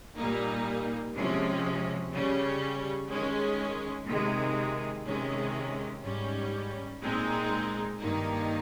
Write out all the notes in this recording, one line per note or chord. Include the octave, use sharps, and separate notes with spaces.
A#2 G3 A#3 D#4
C3 F3 G#3 C#4
C#3 G3 C#4
D#3 G#3 C#4
C3 D#3 G#3
C3 D#3 G#3 C#4
G#2 G3 C#4
A#2 G#3 C4 D#4
G2 D#3 A#3 D#4